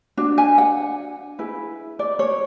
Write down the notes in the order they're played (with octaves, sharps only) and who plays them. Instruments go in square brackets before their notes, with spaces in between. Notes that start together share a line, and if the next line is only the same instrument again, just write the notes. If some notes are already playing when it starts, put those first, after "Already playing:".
[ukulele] D4 F#4
G#5
F#5
E4 G#4 B4
D5
C#5